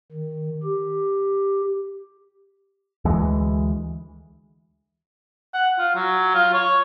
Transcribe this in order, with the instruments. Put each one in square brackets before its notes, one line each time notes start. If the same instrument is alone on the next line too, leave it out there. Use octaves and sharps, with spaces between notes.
[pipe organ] D#3
G4
[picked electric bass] D2 E3 G#3
[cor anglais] F#5
F4
F#3
F4
C#5